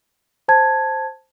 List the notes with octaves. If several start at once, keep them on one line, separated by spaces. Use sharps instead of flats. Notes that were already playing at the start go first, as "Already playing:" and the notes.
C5 A5 G#6